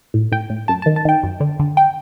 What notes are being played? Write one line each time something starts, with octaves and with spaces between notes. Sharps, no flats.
A2
A2 G5
A2
F#2 A5
A5
D#3
A5
D#3 G5
F#2
D3
D3
G5